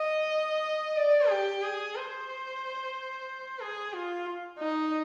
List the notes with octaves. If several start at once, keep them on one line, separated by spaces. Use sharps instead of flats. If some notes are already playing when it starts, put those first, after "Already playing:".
Already playing: D#5
D5
G4
G#4
C5
G#4
F4
D#4